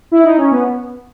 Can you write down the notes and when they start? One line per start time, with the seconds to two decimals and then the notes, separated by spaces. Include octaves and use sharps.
0.12 E4
0.24 D#4
0.38 C#4
0.51 B3